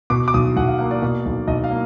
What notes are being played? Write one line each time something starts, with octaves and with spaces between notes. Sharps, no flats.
B2 D6
D6
B1 D#6
B1 F#5
F5
A#3 F5
D5
B2
B1
B1 D#5
F5
A#3